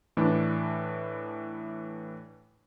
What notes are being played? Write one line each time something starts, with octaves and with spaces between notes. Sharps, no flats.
A2 E3 D4